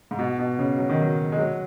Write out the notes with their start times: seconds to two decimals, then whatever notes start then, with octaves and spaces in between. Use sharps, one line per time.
0.11 G#2
0.19 B2
0.39 B2
0.59 C#3
0.78 F#3
0.90 D#3
1.01 F#3
1.32 G#3
1.38 F#3